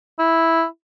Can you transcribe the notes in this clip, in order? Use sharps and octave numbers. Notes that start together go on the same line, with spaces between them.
E4